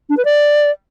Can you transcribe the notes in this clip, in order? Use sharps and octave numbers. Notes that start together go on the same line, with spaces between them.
D4
B4
D5